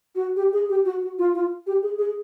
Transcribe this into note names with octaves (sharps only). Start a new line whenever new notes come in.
F#4
G4
G#4
G4
F#4
F#4
F4
F4
G4
G#4
G#4